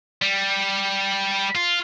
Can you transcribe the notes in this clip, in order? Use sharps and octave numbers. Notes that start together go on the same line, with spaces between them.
G3
F4